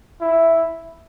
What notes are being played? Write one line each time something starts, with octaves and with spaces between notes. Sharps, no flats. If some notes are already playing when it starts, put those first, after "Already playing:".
E4